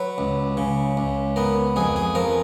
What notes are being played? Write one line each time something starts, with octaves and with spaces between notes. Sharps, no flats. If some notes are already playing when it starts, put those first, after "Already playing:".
Already playing: F#3 B4
C#2
C#3
C#2
B3 A#4
F2 G#4
G#4
F3 A#4